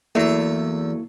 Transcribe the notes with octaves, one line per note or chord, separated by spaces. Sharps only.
E2 F#3 A3 A#3 E4 E5